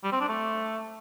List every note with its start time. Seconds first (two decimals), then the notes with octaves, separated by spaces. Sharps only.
0.04 G3
0.12 C4
0.20 D4
0.28 A3